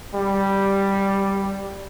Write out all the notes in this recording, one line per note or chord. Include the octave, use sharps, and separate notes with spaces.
G3